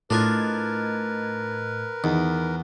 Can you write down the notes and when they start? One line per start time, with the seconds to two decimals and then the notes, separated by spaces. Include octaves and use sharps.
0.10 A2 D4 F4 A#4 B4 D#5 G#6
2.04 E2 D#3